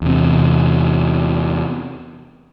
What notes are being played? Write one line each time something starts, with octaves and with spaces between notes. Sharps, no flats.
E2 C3